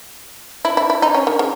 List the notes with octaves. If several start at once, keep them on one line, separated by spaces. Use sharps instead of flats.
E4
E4
E4
D#4
C#4
D#3
C#3